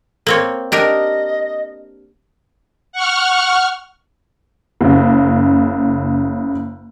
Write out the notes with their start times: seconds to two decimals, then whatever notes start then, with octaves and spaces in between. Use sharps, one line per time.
0.27 A#3 C4 C#5
0.72 D4 G4 A#4 D#5
2.93 F#5 C#6 F6
4.81 F#1 C#3